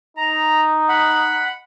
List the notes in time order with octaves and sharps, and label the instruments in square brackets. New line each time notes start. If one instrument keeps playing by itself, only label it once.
[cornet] D#4 [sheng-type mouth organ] A#5
[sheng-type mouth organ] F#5 B5